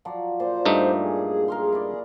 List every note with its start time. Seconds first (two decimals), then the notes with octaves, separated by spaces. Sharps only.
0.05 F3 F#3 D5
0.40 A#2 C5 D5 C6
0.66 G2 A3 D#4
1.04 G#4
1.48 A#4 F5 C6
1.73 E4 D5